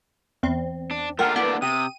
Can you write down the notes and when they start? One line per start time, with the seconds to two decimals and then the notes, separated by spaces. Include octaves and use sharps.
0.43 E2 C4
0.91 D4
1.19 A3 A#3 D4 F4 G#4 A#4 F#5 G5
1.36 B3 E4 D5
1.62 C3 G5 D#6 D#7